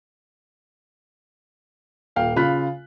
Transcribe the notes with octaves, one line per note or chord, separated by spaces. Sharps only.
D#1 F5 G5
C#3 F4 B5 F#6 B6